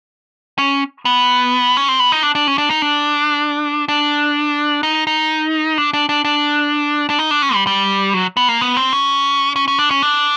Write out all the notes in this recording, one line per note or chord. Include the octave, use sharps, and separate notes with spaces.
C#4
B3
C#4
C4
B3
D#4
D4
D4
C#4
D4
D#4
D4
D4
D#4
D#4
D4
D4
D4
D4
D4
D#4
D4
C#4
G3
G3
F#3
B3
A#3
B3
C4
C#4
C#4
C#4
D4
C#4
D4